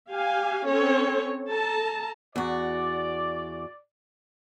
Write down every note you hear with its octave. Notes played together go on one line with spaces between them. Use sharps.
G4 F5 G#5
C4 C#4 A4 C#5
A4 A5 A#5
E2 F#4 D5